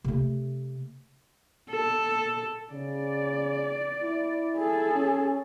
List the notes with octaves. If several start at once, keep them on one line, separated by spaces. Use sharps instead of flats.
C3 A3
A4
C#3 D5
E4
G#4 A4
C#4